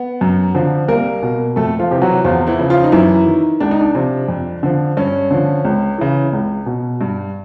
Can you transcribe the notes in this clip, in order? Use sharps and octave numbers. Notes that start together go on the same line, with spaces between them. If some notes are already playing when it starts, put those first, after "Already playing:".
Already playing: B3
F#2
D3 F3
C2 A#3 A#4
B2
F2 A3 A4
F3 F4
C3 E3 G4
F#3 F#4
E2 F3 F4
E3 E4
C#3 F3
F3 F4
D#4
F#2 E3 E4
D#3
C#2 D4
D#4
D4
C3 F3
F2
D3 F3
G2 C#4
D3 F3
C#2
C#3 E3
C#2
B2
G2